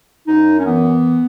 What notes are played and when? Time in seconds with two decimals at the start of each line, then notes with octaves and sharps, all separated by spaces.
0.27 F#2 D#4
0.58 C#4
0.65 E3 B3